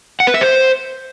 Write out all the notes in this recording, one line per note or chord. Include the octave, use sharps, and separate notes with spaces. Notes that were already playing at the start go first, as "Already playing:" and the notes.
F#5
B4
E5
C5